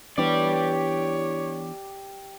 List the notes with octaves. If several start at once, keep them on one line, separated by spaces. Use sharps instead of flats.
E3 B3 D4 G4 C#5 D5